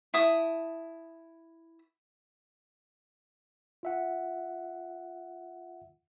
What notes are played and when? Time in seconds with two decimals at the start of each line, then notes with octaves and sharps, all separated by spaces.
0.14 E4 A5 D#6
3.83 F4 E5 F#5